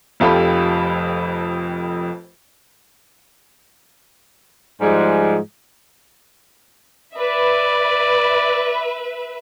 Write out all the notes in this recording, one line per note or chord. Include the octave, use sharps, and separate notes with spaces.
F1 F2 F4 G4 A4 B5
G#2 F3 G3 G#3
B4 D5 E5